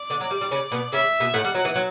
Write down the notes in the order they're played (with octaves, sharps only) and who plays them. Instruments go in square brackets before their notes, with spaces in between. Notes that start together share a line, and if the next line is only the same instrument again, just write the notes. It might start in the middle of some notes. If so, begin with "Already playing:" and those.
Already playing: [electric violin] D5
[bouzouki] D3 D4
F#3
G3
G3
C#3 C#4
B2 B3
[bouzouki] C#3 C#4 [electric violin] E5
[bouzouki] B2 B3
[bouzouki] A2 A3 [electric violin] F#5
[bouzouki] G3
F#3
E3
F#3